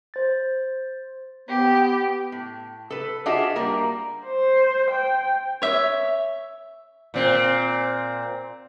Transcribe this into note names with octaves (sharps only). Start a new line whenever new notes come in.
C5 A6
B3 G4
A2
A4 B4
D4 F4 F#4 G#4 D#5 E5
G3 A#3 A#4 A#5
C5
G5
C#5 E5
A#2 C4